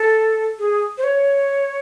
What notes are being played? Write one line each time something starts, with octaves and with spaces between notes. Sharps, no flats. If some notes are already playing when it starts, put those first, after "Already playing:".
Already playing: A4
G#4
C5
C#5